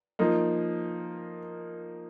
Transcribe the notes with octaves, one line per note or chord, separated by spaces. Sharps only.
F3 A#3 D#4